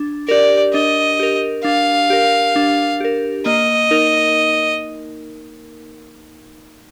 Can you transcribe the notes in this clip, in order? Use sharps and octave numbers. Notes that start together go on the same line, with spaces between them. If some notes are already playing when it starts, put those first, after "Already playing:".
Already playing: D4
G4 A#4 D5
D4 D#5
G4 A#4
D4 F5
G4 A#4
D4
G4 A#4
A#3 D#5
D#4 A#4